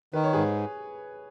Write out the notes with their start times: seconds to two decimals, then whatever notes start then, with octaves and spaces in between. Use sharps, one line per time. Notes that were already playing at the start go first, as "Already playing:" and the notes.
0.13 D#3 B4
0.24 C#5
0.33 G#2 G#4 B4